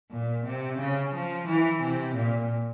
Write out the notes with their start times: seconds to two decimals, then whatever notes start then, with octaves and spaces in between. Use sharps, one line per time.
0.11 A#2
0.45 C3
0.79 C#3
1.13 F3
1.48 E3
1.82 C3
2.16 A#2